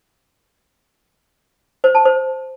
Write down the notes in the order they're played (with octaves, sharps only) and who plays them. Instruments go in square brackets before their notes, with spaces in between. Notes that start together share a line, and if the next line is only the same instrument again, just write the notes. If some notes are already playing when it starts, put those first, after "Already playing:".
[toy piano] C5
A5
C5